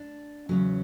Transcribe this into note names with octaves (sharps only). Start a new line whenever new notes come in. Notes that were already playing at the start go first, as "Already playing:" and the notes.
Already playing: D4
E2 C#3 F#3 C#4